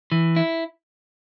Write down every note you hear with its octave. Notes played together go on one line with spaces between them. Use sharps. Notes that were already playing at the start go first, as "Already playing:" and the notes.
E3
E4